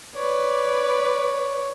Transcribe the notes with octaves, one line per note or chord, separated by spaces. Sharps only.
B4 C#5 D5